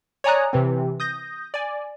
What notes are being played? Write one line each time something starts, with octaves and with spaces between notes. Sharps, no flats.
C#5 D5 G#5 A#5 D#6 F#6
C3 E3 C4
D#6 G6 A#6
D5 G#5